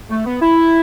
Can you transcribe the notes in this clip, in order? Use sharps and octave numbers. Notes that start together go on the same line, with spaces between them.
A3
B3
E4